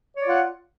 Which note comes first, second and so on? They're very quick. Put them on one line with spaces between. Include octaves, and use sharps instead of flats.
C#5 D5 F4 F#5